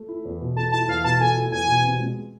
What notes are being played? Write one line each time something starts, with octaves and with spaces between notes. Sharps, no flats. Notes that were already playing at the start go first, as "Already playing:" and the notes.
Already playing: A3
E4
E2
B2
A3 A5
E4 A5
E2 F5
B2 A5
A3 G#5
E4
E2 G#5
B2
C3
G#3